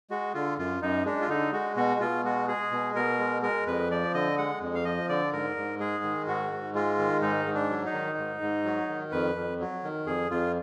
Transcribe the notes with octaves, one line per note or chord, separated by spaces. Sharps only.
G#3 F#4
D3 F4
F#2 F4
F#2 D#4
G#3 D4
F4
D3 D#4
G#3 F#4
B2 F#4
B2 F4
G#3 F#4
G#3 G#4
B2
B2 A#4
G#3
G#3 A#4
F2 B4
F3 D5
D3 D#5
G#3 F#5
F2
F5
F3 D#5
D3 D5
G#2 A#4
G#2
G#3 G#4
D#3
G#2 F#4
G#2
G#3 F4
D#3
G#2 D#4
G#2
D4
F#3
D#4
D#3
G#2
G#2
F#3
D#3
F2 B4
F2
F#3
D#3
F2 G#4
F2 F4